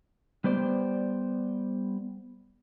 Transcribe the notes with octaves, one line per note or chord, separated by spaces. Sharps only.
G3 B3 C5 D5